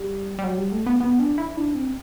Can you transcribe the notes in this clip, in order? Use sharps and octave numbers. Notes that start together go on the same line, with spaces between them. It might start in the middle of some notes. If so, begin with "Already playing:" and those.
Already playing: G3
G3
F#3
G3
A3
B3
B3
D4
E4
D4
C4